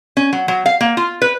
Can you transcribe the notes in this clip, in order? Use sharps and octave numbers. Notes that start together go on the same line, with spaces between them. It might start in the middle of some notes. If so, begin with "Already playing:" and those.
C#4
F#3
F#3
F5
A#3
F4
B4